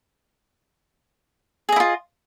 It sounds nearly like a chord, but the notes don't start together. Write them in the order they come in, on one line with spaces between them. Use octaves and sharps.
G#4 D#5 E4 F4